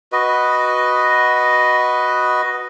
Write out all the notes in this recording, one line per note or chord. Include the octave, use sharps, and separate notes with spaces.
F#4 B4 D#5